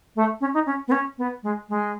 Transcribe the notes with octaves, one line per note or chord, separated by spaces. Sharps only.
A3
C#4
D#4
C#4
B3
C#4
B3
G#3
G#3